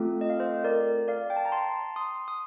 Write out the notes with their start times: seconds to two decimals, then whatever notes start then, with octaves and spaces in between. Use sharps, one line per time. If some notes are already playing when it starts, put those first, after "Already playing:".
Already playing: A3 C4 F4 A4
0.21 D#5
0.30 F5
0.40 C5 D#5
0.64 A#4 D5
1.08 D5 F5
1.30 G5
1.36 A5
1.45 A#5
1.52 A5 C6
1.96 C6 D#6
2.28 D#6